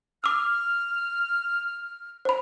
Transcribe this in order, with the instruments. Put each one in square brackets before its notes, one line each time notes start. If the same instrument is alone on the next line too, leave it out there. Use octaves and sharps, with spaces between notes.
[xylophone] D6 E6 [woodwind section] F6
[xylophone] C5 B5